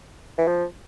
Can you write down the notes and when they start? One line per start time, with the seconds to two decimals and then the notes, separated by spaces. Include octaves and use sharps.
0.38 E3
0.47 F3